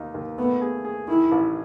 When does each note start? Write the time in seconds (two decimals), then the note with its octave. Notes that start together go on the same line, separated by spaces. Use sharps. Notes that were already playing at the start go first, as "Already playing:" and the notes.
Already playing: D#2 D#4
0.14 D#2
0.38 A3 B3
0.61 G#4
0.85 G#4
1.08 D#3 E4
1.32 A1